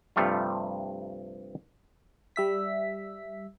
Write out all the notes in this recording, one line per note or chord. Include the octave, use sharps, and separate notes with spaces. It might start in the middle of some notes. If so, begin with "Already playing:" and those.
G2 C3 F3 G3 A3 F4
G3 E5 B6